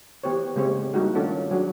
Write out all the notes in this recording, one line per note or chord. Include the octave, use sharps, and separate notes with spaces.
E3 B3 G4 C5 C#5
C#3 G#3 A#3 C4 G4 C#5
G3 A#3 D#4 E4 F#4 G#4
D#3 A3 C#4 D4 F4 A4
F#3 D4 F#4 G#4